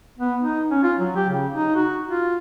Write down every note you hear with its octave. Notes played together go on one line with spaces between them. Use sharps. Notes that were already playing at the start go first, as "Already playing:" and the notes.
B3
D#4
C#4
F4
F#3
G4
C#3
D#4
F#4
F4